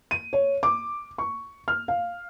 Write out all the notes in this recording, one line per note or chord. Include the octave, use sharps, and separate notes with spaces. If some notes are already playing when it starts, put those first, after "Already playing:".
D#7
C#5
D6
C#6
F6
F5